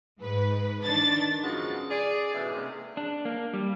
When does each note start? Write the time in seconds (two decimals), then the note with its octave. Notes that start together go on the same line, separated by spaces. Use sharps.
0.20 G#2 B4
0.83 D#3 D4 A6
1.43 F#2 C#3 F3 G#3 B3 F#4
1.90 G#4 D5
2.34 G#2 B2 E3 A3 C#4
2.53 C3 G#3 A#3
2.97 D4
3.25 A#3
3.54 G3